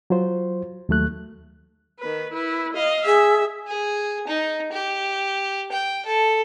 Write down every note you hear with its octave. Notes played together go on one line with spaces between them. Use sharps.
F#3 F4 C5
D#2 F#3 A3 F#6
D#3 B4
E4 B4
D#5 F5
G#4 E5
G#4
D#4
G4
G5
A4